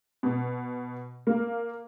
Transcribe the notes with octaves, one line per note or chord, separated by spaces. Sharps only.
B2
A#3